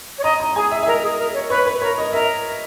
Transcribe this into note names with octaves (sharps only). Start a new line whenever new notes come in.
C#5
D#5 A#5
A#5
G#4 G#5
E5
E5
A#4 D#5
G#4
A#4
C#5
B4 C#5
B4
A#4 C#5
D#5
A#4 E5